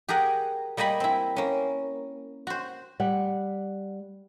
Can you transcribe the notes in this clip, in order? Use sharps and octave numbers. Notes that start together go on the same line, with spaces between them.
G4 G#4 A#4 F#5 G#5
G3 A#3 D#5 G#5 B5
C4 E4
A#3 C#4
F#4 C5
G3 F#5